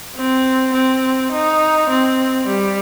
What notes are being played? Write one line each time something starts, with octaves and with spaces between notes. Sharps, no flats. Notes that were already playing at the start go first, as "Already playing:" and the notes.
C4
C4
D#4
C4
G3